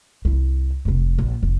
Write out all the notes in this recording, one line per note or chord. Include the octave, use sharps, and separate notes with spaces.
C2 E4
F1 C3
A#1
F1